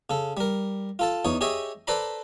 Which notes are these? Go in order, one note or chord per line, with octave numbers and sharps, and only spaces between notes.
C#3 A4
G3 A#4
F4 A4 A5
E2 D#4 C#5
G4 G#4 C#5 D#5 E5
A4 B4 C5 D5 A#5 B5